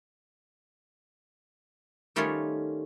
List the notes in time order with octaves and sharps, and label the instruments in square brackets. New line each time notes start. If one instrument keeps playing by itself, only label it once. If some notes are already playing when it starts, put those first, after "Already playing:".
[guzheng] D#3 G3 A3 C#4 F4 C#5